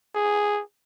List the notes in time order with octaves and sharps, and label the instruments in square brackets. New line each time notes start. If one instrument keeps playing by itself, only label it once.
[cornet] G#4